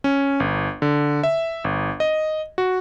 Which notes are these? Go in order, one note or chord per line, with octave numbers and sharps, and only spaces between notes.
C#4
G1
D3
E5
G1
D#5
F#4